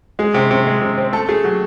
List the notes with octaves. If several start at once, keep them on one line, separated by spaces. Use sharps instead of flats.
G#3 G#4
C3
C3
G#3
C3
C4
A3 A4
A3 G#4
F#3 G4